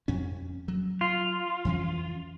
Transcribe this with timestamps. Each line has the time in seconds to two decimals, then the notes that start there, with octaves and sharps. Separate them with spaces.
0.08 F2 C#4
0.68 F#3
1.01 F4
1.65 F2 E3 C#4